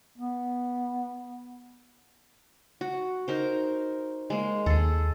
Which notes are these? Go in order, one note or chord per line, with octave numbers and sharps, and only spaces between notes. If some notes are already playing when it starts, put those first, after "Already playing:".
B3
F#4
D#4 A#4 C5
G#3 A#3
D#2 G#4 A4